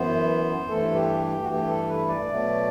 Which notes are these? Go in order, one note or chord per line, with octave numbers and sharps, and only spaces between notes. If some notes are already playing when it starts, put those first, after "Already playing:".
Already playing: F#2 E3 B3 C5
G2 E3 A3 A4
G4
G4
F#4
G2 E3 A3 G4
A4
B4
D5
B2 F#3 A3